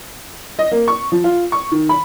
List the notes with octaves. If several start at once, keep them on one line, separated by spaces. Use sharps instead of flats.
D#5
A#3
C#6
F3
F4
C#6
D#3
B5